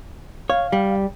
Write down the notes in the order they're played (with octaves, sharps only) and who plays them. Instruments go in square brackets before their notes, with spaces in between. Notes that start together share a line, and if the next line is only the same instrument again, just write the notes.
[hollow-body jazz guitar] C#5 [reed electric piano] F5
[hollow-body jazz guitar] G3